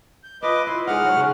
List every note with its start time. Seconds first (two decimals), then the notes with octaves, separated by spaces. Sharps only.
0.23 G6
0.42 D4 F4 B4 D#5 D6
0.67 E4 C6
0.87 G#3 D#4 F#5 F6
1.04 F#3 C#5
1.17 C#3 C#4